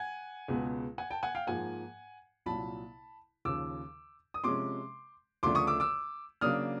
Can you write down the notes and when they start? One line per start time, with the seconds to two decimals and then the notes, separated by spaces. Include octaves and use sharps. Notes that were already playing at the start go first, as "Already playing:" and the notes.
Already playing: F#5 G#5
0.48 C#2 B2 G#3 B3
0.98 F#5 G#5
1.10 G5 A5
1.23 F#5 G#5
1.35 F5 G5
1.47 G#2 F3 A#3 F#5 G#5
2.46 C2 A#2 F#3 A5 B5
3.45 D#2 C#3 F3 D6 E6
4.34 D#6
4.44 C3 F3 G#3 C#4 C6 D6
5.43 D2 C#3 F3 A3 D4 C6 D6
5.55 C#6 D#6
5.67 D6 E6
5.80 D6 E6
6.41 C#3 F#3 A#3 D4 D#6 F6